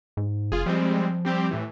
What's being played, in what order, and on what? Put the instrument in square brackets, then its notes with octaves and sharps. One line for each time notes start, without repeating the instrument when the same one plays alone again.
[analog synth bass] G#2
[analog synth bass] F#1 [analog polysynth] F4 G#4
[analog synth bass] F3 [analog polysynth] G3 G#3 C4
[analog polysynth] G3 C4 G4
A2 E3